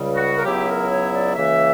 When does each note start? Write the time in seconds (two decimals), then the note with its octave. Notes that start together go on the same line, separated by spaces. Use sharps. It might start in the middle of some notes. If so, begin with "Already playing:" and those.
Already playing: C#2 C#3 G3
0.14 F#4
0.37 A#4
0.44 C#2 C#3 F#3 B3 E4 G4
0.67 A#4
0.90 C#5
1.13 D5
1.35 C#2 C#3 E3 A#3 E5